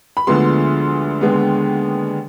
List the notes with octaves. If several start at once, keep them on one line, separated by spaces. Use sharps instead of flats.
B5
D2 D3 F3 G#3 B3 C6
D#2 D3 G#3 B3